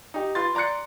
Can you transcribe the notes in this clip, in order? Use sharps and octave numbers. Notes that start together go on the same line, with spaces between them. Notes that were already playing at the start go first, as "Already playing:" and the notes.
D#4 G4
F4 B4 C6 A6
D5 A#5 C6 F#6 C#7